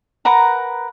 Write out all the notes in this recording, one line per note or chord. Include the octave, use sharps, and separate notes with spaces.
A#4 B4 F#5 A#5